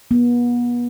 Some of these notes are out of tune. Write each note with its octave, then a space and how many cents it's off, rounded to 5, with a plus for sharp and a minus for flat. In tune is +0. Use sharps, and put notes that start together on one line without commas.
B3 -35